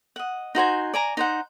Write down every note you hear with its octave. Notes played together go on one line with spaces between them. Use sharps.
D#5 F#5
D#4 F#4 C5 G#5
D5 G#5 A#5
D#4 C5 F#5